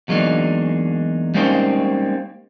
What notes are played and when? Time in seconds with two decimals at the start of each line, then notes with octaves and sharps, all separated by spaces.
0.08 E2 F#3 G#3 A#3 D4 D#4
1.34 G3 G#3 A#3 C4 C#4 D#4